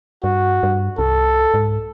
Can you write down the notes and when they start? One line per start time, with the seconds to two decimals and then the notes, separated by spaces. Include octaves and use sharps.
0.24 G2 F#4
0.63 G2
0.99 C2 A4
1.54 G#2